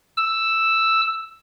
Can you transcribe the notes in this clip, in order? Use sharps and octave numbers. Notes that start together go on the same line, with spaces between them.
E6